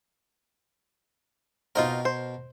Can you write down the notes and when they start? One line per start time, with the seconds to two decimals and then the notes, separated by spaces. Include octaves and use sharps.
1.75 B2 C4 D#4 F4 A#4
2.05 C5